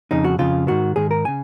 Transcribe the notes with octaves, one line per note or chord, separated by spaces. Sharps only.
F2 C#3 D#4
F#4
F2 C#3 F4
G#2 D#3 F#4
G#2 D#3 G#4
A#4
C#3 G#5